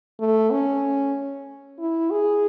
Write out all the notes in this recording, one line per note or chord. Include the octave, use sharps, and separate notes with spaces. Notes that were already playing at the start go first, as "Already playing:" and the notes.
A3
C#4
E4
G#4